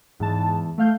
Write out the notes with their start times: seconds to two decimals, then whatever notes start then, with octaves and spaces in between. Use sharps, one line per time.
0.20 E2 G#2 A5
0.78 A3 F5 G6